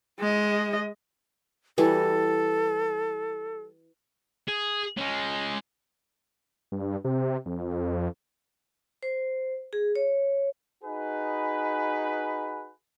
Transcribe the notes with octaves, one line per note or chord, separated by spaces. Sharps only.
G#3 D#5
E3 G3 F#4 A4
G#4
G#3 C#4
G2
C3
F2
C5
G#4
C#5
D#4 F#4 G#4 B4